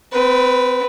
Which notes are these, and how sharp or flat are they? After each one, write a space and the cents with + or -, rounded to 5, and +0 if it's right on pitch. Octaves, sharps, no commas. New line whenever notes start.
C4 -30 B4 +0